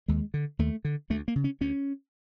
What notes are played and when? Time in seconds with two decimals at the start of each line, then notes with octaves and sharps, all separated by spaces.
0.08 D#2 G#3
0.34 D3
0.59 D#2 A3
0.85 D3
1.10 D2 A3
1.28 A#3
1.36 C#3
1.44 C#4
1.61 D2 C#4